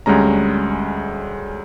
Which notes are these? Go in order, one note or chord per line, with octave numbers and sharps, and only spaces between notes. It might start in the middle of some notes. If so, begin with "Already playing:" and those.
D2 G3 G#3 C#4 A#5